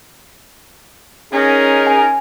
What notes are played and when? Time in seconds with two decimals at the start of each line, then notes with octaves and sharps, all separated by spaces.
1.33 C#4 D#4 G#4 A#4
1.87 G#5